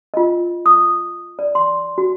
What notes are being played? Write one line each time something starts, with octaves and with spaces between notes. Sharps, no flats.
F4 D#5
D#6
D5
C6
F#4